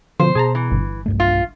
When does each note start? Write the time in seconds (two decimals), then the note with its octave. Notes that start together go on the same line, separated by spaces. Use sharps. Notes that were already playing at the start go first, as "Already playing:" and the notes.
0.20 B2 D3 F3 C5
0.35 B2 G#4 A5 A#5
0.55 E3
0.71 G1
1.06 B1 G2 A3
1.20 F4